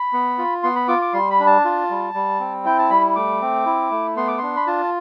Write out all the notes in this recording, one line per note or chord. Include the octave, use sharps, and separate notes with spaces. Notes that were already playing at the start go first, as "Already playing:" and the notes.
Already playing: B5
B3
F4
B3 C6
B5
F4 D6
D6
G3 C6
B5
D4
A5
F4
G3
G3
C4
E4 G5
A5
G3 B5
A3 D6
C4
E4
A3
B3 C6
D6
D4 C6
B5
F4 A5